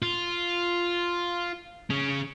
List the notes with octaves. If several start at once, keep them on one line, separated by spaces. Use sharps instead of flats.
F4
C#3 C#4